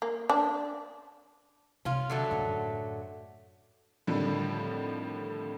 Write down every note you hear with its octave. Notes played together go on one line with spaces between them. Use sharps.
A#3
D4
C3 C#4 F4
D3 F#3 A3
F#2 A2
F2 A2 D3 D#3 F3 G3